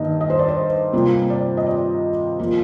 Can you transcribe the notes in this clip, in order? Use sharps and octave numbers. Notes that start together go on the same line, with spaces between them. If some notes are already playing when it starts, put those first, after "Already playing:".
Already playing: G2 D#3 A#3 D#4 D#5
D#5
C5
D5
C5
C3 G3 A#3 F4
D5
D#5
D5
F3 A#3 F4